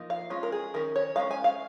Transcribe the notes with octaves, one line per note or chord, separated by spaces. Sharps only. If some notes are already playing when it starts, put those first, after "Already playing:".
Already playing: F3 A#3 D#4
F5
G#3 C#4 F4
A#4
G#4
D#3 C#4 A#4
C#5
G#3 C#4 F5
G#5
F5